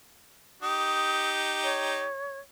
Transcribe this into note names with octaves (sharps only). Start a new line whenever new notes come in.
D#4 G4 D#6
C#5